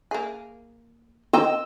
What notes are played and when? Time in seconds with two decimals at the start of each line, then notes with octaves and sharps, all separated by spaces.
0.11 A#3 G#4
1.33 C4 D#5 G5 E6